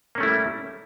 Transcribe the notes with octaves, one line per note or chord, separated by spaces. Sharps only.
G3 A3 A#3 C#4 E4